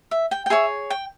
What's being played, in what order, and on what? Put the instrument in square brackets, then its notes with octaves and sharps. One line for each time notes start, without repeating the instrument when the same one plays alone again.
[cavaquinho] E5
G5
G5
G#4 C#5 E5
G5